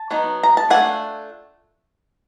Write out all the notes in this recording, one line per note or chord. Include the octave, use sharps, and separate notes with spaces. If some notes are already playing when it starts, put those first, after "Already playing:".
Already playing: A5
F#3 B3 D#4
A#5
A5
A3 D4 F4 F#5 G#5